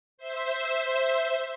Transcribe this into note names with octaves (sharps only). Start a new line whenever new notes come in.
C5 E5